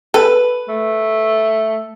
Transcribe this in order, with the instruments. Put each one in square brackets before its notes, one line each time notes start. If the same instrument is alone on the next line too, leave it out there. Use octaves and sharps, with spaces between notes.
[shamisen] A4 [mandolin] B4
[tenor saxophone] A3